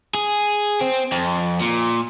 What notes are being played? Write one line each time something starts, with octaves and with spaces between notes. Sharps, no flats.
G#4
C4
F2
A#2